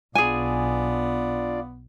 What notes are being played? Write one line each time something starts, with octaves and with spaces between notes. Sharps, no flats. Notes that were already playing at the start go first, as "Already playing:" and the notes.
B1 B3 D4 F4 G#4 D5 G#5